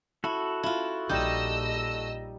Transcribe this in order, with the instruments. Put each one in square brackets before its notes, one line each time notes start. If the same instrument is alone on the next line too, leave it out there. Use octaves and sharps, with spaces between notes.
[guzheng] E4 [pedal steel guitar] F#4 A4
[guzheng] E4 F4
[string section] A#1 D#5 E6 [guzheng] G3 D#4 G4